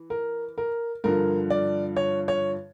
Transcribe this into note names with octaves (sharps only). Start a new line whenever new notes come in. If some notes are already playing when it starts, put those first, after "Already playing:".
Already playing: E3
A#4
A#4
G2 D3 F3 A#4
D5
C#5
C#5